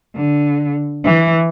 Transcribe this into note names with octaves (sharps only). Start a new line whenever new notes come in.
D3
E3